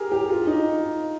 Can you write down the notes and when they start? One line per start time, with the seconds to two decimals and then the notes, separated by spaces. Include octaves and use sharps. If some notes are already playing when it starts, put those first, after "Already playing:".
Already playing: G4 G#4 A#4
0.12 G4
0.29 F4
0.47 D#4